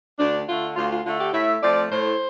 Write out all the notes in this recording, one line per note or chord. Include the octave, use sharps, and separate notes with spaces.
D2 D4
D3 A3 F4
D2 F4
F4
D3 A3 F4
G4
A2 E5
F3 A3 C4 D5
A2 C5